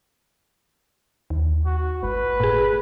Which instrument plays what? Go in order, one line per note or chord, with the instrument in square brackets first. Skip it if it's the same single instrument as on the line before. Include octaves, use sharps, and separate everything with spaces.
[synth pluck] D#2
[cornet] F#4
[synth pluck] G#1 [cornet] B4
[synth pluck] A2 G#4